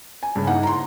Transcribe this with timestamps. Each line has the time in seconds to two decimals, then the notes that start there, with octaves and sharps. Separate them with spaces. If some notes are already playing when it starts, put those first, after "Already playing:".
0.23 G#5
0.36 G2 C#3
0.47 A#3 D#4 E4 F#5
0.63 A#5 C6